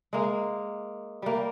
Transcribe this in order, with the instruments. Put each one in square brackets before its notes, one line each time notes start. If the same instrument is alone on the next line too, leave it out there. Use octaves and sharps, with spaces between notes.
[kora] G#3 A#3
G3 A#3